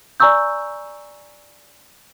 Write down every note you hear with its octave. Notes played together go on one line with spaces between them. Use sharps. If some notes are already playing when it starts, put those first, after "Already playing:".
D5 G#5 A#5 C#6 E6 G6